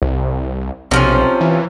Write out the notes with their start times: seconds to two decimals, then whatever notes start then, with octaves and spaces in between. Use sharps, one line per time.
0.02 C2
0.91 B1 C3 F3 C#4
1.41 E3